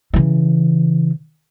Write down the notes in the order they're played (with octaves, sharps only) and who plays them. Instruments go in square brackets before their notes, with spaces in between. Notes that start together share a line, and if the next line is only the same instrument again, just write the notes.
[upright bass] C#3 E3